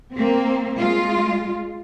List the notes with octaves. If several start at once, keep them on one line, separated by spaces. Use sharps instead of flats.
A#3 C4
G#3 F4